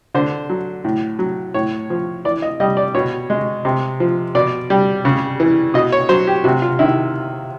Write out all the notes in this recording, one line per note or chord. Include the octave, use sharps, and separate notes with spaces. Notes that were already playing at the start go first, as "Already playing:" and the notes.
D3 C5
F#3
A2
F#3
A2 C#5
F3
E3 D5
D#5
G3 D#5
D5
B2 C#5
G#3
C3
F3
B2 D5
G3
C#3
E3
B2 D#5
C#5
F#3 C5
G4
C3 F#4
F4
D#3 E4